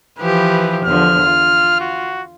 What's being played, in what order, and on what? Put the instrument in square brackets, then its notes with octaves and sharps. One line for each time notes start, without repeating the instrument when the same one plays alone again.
[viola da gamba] E3 F3 G4 [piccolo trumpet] B4
[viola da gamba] E2 D3 F3 [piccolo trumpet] F6
[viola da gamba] F4
[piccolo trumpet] F#4